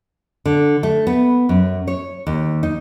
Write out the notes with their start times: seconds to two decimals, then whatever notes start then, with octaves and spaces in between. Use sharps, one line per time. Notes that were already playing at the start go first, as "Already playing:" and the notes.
0.45 D3
0.83 A3
1.07 B3
1.49 F#2
1.88 C#5
2.27 D#2
2.63 D#4